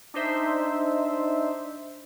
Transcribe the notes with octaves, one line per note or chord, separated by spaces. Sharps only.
D4 D#4 C5 E5